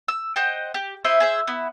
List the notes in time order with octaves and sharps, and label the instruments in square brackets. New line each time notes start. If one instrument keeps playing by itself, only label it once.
[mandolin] E6
C5 D#5 F#5 G5
G4
E4 C5 D#5 E5
G#4 C5 E5
B3 E4